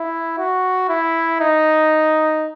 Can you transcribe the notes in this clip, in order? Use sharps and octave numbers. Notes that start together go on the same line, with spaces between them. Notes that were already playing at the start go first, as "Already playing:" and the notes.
Already playing: E4
F#4
E4
D#4